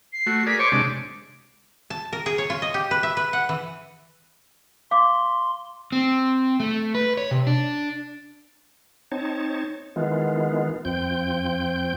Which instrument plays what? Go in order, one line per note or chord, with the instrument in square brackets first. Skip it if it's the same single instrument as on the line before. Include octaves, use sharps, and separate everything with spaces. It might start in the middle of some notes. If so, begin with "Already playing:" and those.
[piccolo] C7
[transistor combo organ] A3 F#4
[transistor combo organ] G#4 A#4 D5 [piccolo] B6
[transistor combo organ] C5 C#5 C#6 [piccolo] D6
[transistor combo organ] C3 G#3 D4
[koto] A5
A#4
G#4
C#5
F4
D#5
G4
B4
E5
B4
F#5
E3
[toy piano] F5 D6 [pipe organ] C6
[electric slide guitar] C4
A3
B4
C#5
C3
D4
[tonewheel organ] C4 D#4 C#5 A5
D#3 E3 G#3 B3 F4
F2 F3 C4 G5 G6